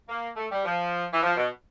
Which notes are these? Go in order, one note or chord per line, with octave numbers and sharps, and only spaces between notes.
A#3
A3
G3
F3
E3
F3
B2